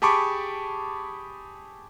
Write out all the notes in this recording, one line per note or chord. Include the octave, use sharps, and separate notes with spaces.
G4 G#4 A5 B5 C#6 D6